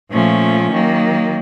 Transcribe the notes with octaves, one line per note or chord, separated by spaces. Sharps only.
A#2 F3 A3 C#4
D#3 F#3 A#3